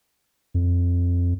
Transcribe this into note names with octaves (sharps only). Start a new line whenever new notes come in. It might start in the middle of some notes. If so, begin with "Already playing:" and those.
F2